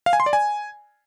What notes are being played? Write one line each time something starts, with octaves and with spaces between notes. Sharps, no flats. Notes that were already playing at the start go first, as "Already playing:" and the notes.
F5
G#5
C6
D5
G#5